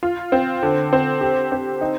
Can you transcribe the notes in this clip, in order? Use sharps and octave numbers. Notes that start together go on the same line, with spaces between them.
F4
C4
D3
C4
G4
C4
D#4